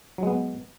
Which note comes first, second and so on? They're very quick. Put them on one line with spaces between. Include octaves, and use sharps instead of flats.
F#3 G#3 B3